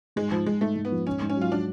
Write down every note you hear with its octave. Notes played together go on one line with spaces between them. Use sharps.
G#2 G#3
G#2 F3
G#2 G#3
G#2 A3
G#2
B3
F3
G#2 C#4
G#2
C#4
F#3 F4
F#3 D4